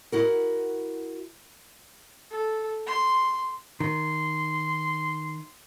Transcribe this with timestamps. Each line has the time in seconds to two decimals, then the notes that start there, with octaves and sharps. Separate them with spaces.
0.12 E4 F#4 A#4
2.31 A4
2.87 C6
3.80 D#3 C6